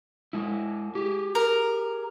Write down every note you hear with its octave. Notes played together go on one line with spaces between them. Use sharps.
G#3 E4
G4 G#4
A#4